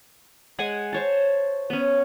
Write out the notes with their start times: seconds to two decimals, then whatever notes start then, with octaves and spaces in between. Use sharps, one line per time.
0.59 G#3 F#5 G#5
0.93 C5 C#5 A5
1.70 B3 C#4